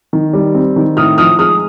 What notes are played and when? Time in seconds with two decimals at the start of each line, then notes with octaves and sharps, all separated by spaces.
0.13 D#3
0.33 G3
0.54 C4
0.76 D#3
0.97 A2 D#6 F6
1.18 F3 D#6 F6
1.39 G#3 D#6 F6